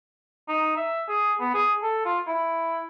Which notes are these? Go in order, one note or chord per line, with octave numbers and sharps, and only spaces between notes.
D#4
E5
G#4
B3
G#4
A4
F4
E4